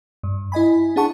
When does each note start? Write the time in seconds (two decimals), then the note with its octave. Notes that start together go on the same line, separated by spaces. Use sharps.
0.23 G2
0.52 E4 D#5 G#5 B5
0.96 D4 E4 G#4 F#5 A5 C#6